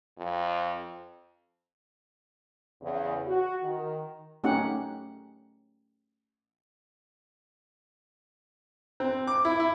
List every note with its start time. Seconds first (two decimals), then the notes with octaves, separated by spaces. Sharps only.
0.18 F2
2.82 E2 C#3
3.27 F#4
3.62 D#3
4.44 A3 C#4 D#4 G4 F#5
9.00 C4
9.27 D6
9.45 E4
9.60 E4